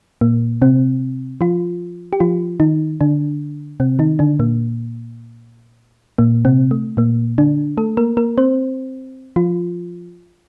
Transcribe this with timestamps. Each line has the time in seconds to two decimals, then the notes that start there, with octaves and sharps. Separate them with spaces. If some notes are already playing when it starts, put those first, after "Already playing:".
0.21 A#2 A#3
0.62 C3 C4
1.41 F3 F4
2.13 G4
2.20 F3 F4
2.60 D#3 D#4
3.01 D3 D4
3.80 C3 C4
3.99 D#3 D#4
4.19 D3 D4
4.39 A#2 A#3
6.18 A#2 A#3
6.45 C3 C4
6.71 A3
6.97 A#2 A#3
7.38 D3 D4
7.77 A3 A4
7.97 A#3 A#4
8.17 A#3 A#4
8.38 C4 C5
9.36 F3 F4